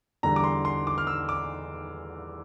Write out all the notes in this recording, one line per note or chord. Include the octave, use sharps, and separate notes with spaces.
E2 D3 G3 A#5
D6
C6
C6
D6
F6
E6
D6